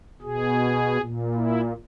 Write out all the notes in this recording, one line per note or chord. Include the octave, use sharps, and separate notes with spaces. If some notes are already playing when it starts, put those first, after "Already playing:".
B2 G#4
A#2
E4